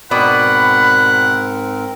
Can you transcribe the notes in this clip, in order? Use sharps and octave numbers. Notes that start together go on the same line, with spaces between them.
G#2 B2 C4 A#4 D5 F#5 B5